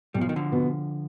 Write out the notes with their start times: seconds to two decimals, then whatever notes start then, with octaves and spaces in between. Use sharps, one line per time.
0.14 B1 G3
0.21 F3
0.29 D#3
0.36 D3 F3
0.52 B2 B3